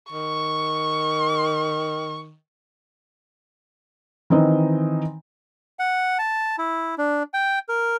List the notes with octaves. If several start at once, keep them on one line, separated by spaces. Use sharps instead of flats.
D#3 C#6
D#3 E3 C4 D#4 D#5
F#5
A5
E4
D4
G5
A#4